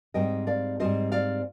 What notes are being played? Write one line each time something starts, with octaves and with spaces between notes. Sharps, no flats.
G#2 G3 C4 D#5 G5
D5 F5
G#2 G3 C4 C5 D#5
D5 F5